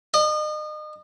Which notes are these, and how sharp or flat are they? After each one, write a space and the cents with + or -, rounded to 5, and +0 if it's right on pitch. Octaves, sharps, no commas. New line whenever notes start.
D#5 -35